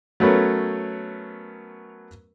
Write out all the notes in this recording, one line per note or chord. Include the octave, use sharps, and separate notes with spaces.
F#3 A3 B3 C#4 A#4